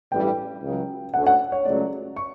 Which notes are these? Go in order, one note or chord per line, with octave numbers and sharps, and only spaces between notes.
A1 G2 E3 G3 G5
C#2 C#3 F#3
D2 D3 A3 C#4 F#5
F#5
C#5
C#2 C#3 F#3 A3 D5
C#6